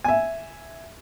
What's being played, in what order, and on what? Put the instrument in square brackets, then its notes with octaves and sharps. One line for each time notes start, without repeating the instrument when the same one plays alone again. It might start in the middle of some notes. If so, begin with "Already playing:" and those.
[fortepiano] E5 G#5